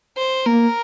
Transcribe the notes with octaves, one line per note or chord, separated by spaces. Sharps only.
C5
A#3 A#4